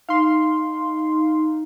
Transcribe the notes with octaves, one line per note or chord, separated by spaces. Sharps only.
D#4 F5 C6